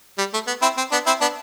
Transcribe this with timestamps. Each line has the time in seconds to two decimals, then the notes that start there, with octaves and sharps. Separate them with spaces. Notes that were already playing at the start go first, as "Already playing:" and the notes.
0.18 G3
0.33 A3
0.47 B3
0.62 C4 E4
0.77 C4
0.91 B3 D4
1.06 C4 E4
1.21 B3 D4